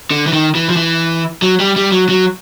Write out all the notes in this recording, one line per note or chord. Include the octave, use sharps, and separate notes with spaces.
D3
E3
D#3
E3
F3
E3
F#3
G3
G3
F#3
F#3